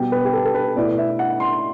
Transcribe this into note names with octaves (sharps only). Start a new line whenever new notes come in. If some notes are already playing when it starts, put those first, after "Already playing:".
Already playing: B2 G3 B3 G4
B4
G4
A4
A4
B4
B2 A3 E4 D5
E5
F#5
C6